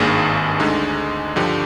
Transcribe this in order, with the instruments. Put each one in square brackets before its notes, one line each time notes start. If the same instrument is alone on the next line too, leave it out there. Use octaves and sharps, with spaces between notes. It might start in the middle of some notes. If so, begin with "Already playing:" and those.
Already playing: [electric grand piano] G#1 G2 D#3 A#3 G#4
D2 D3 G#3 D#4
G2 D3 F3 G4